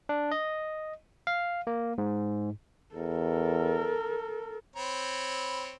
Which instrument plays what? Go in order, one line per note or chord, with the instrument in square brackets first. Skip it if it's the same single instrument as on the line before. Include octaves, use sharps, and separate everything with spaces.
[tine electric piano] D4
D#5
F5
A#3
G#2
[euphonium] E2 [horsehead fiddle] A4 A#4
[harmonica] C4 C#5 B5